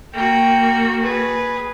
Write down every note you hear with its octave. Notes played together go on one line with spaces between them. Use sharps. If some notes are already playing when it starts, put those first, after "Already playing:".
A#3 F#4 G5 A#5
G#4 B4